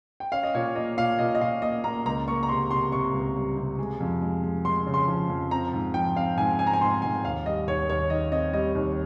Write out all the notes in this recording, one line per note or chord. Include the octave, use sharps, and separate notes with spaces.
G5
C#4 F5
D#5
A#2 C#5
A#3 D#5
A#2 F5
A#2 D#5
D#5
A#2 F5
A#3 D#5
A#3 A#5
C#2 A#5
A#3 C#6
A#5
C3 C6
C3 C6
C3 C#6
C#2
G3
C3
G#3
F2
G#3
G#3
G#3 C6
C#3
C6
F3
F2
C4 A#5
G#2
F3 G5
C4 F5
G#2 G#5
C4 G#5
A#5
G#5
G#2 C6
G#2 G#5
D#2 F5
G3 D#5
D#2 C#5
D#2 C#5
D#3 D#5
C4 D#5
G3 D#5
D#2